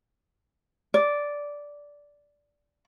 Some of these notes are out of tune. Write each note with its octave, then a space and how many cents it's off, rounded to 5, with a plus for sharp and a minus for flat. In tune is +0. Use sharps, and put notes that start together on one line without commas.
D5 -10